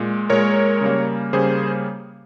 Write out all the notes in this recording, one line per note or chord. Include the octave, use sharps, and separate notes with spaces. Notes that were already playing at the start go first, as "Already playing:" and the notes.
Already playing: A#2 G#3
A#2 G#3 A#4 C#5
C#3 G3 A#3
C#3 G3 A#3 G#4 C5